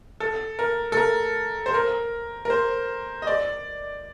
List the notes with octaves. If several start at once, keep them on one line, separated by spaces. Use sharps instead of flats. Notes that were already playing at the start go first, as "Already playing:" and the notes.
A4
A#4
A4
A#4
C5
A#4
A#4
C5
D#5
D5